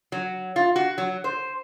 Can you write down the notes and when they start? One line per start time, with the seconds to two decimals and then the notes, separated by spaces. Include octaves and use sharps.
0.12 F#3
0.56 F4
0.76 F#4
0.98 F#3
1.24 C5